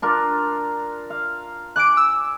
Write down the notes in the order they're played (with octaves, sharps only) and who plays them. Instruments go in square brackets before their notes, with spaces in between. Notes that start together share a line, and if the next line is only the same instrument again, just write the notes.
[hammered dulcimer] D4 F4 A#4
F5
[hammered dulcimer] G#5 D6 [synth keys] F#6 D7
[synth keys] E6